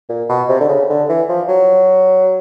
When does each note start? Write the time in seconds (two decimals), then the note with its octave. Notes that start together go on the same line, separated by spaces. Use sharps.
0.09 A#2
0.29 B2
0.49 C3
0.60 D3
0.69 C#3
0.90 D3
1.09 E3
1.29 F3
1.49 F#3